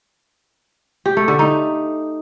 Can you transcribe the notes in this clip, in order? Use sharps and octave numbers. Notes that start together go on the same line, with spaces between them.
G4
A3
D3
D#4